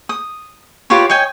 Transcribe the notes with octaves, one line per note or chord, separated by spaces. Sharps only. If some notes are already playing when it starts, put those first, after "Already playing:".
D#6
F4 G4 B4 C#5
C#5 D#5 G5 G#5